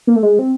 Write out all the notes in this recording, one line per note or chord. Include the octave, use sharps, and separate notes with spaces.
A#3
A3
G#3
C4